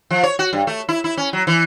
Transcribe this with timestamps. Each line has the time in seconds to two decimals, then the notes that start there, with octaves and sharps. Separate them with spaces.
0.10 F3
0.23 C#5
0.39 F#4
0.53 G2
0.67 A3
0.89 E4
1.04 E4
1.17 C#4
1.33 F#3
1.47 E3